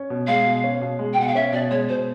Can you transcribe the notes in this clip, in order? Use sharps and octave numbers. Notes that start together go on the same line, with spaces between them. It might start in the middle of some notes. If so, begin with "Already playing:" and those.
Already playing: C#4
B2
G#3 F5
B2
C#4
B2
G#3
G5
B2 F#5
F5
C#4 E5
B2 D5
G#3 C#5
B2 C5